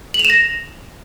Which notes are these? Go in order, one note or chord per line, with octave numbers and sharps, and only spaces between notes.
F#7
F7
E7
A#6